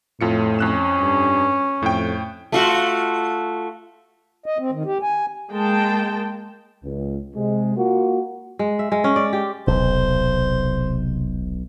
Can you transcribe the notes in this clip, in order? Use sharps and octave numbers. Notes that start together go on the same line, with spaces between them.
F2 A2 F4 C#7
F2 C#4 F#6 E7
G2
F2 A2 G5
A3 F4 F#4
D#5
C4
D#3
G4
G#5
G#3 A#3 G5 A5
C#2
C3 G#3
A#3 F4 F#4
G#3
E5
G#3
C#4
D5
G4
D#1 B1 C3 C5